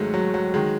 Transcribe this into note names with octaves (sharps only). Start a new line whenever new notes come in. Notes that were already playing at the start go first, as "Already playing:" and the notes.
Already playing: G#2 D#3 F#3 G#3 A3
F#3
F#3
D#3 F#3 G#3